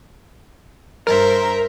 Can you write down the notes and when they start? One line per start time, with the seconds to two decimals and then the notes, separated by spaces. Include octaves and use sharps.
1.07 G2 A#4 C5 E5